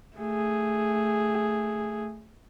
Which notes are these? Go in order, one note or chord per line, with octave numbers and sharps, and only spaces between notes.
A3 G#4